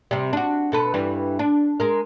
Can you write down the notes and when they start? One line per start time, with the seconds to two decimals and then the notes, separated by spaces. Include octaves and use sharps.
0.11 C3 G3
0.33 D4 F#4
0.72 B2 A4 B4
0.94 G2 E3 G3
1.39 D4
1.80 G#3 A#4